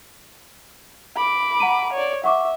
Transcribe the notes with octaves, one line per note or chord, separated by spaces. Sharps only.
B5 D6
F#5 A#5 D#7
C#5 D5
E5 F#5 C#6 D6